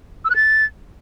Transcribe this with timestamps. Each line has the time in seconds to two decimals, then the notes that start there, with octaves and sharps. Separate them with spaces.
0.25 E6
0.30 F#6
0.35 A6